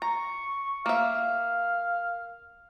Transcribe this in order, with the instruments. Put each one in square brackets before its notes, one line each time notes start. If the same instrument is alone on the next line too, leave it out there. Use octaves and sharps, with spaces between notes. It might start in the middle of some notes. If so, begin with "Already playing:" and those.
[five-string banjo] A#5 [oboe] C#6
[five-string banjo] A#3 E5 [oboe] F5